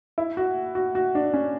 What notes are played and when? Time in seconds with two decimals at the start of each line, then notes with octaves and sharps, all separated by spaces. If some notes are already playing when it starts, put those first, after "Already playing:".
0.18 E4
0.37 F#4
0.75 F#4
0.95 F#4
1.15 D4
1.34 C#4